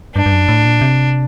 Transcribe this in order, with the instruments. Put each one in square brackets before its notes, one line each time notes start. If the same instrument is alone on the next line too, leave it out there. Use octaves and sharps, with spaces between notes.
[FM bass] G2 [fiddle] D4
[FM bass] G2
F#2
A2
A#2
C3